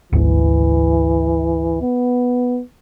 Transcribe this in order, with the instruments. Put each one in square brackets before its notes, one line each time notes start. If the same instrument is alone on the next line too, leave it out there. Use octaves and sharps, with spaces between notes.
[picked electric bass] G#1 D2 [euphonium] E3
[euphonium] B3